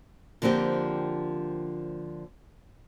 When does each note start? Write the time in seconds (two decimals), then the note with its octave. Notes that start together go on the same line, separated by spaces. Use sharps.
0.42 D3 F3 A#3 C4 G4